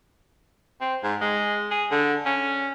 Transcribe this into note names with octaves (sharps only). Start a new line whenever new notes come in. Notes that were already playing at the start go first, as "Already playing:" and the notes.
C4
G#2
G#3
G#4
D3
C#4